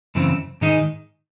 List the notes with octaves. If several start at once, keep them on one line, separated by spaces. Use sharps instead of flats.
F#2 C#3 E3 C4
G#2 D#3 G#3 D#4